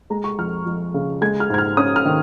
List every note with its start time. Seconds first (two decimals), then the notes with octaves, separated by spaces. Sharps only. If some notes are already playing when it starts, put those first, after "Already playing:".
0.10 G#3 A#5
0.24 C#6
0.39 F2 F6
0.66 F2
0.94 C#3
1.21 G#3 G#6
1.40 F6
1.50 G#2 G#6
1.58 F6
1.77 C#4 D#6
1.96 F6
2.06 D#3